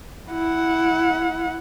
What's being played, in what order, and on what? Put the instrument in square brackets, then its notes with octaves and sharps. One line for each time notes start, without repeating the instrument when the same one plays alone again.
[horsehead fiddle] E4 F#5